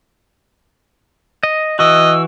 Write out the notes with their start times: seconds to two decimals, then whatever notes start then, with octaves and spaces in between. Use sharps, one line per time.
1.43 D#5
1.79 E3 F#4 D#5 E6